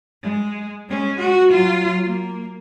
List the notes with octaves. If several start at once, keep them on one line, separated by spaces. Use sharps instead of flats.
G#3
G#3 C#4
F#4
F#3 F4
A#3